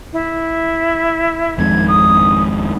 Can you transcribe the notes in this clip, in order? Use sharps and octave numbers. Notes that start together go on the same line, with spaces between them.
E4
G#1 F2 G#2 G#6
D#6